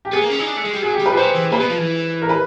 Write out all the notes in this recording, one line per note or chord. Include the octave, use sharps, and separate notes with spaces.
G4
B3 G#4
A#3
C#4
D#4
D4
A3
G#3
G3
F#3 G#4
G4
G3
B4
F3
F#3 C5
E3
A#2 B4
B2
F3
E3
A#4
B4